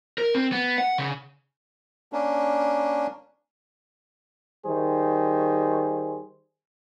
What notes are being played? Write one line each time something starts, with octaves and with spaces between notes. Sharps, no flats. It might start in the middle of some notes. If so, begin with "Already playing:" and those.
A#4
C4
B3
F#5
C#3
A#3 C#4 D4
D#3 G3 G#4 C5